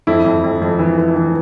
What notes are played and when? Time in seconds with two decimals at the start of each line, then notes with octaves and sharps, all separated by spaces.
0.07 F2 E4
0.25 F2
0.44 F2
0.61 F2
0.79 E3
0.98 E3
1.16 E3